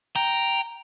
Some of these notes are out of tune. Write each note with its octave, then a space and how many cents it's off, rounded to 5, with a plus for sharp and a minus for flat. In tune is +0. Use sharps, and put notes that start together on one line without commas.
G5 +0 A#5 +0